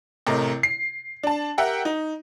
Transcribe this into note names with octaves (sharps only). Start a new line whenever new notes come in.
A1 C3 A3 A#4 D#5
C7
D4 A5
G4 A#4 E5 F#5 G5
D#4